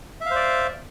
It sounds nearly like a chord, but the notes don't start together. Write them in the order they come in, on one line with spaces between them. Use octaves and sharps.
E5 F5 C5 D5